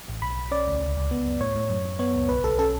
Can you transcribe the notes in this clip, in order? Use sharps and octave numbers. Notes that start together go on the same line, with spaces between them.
A1
B1 B5
B1
C#4 D5
D2
C#2
C#2
B3
F#2
A2 C#5
A2
F#2
F#2
B3 C#5
C#2
B1 B4
B1 A4
C#4 A4